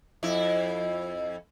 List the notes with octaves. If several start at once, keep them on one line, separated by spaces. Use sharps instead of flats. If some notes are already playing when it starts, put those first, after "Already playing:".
F2 E4